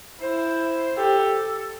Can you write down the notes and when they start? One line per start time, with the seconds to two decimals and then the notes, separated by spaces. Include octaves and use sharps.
0.21 E4 C5
0.96 G4 A4